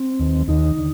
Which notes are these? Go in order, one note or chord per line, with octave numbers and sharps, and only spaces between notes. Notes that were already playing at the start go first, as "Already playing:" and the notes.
Already playing: C4
D#2 D#3
D#2 D#3 D#4
D3